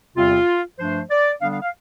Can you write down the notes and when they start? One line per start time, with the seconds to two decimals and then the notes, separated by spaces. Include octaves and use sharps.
0.17 E2 C3 G3 C4 F4
0.79 G2 F3 A3 D4 C5
1.10 D5
1.41 D3 G3 B3 D4 F5
1.52 F5
1.62 F5